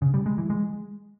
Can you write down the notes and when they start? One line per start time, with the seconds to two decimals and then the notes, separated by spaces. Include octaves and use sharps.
0.02 C#3
0.14 G3
0.26 G#3
0.38 E3
0.50 G#3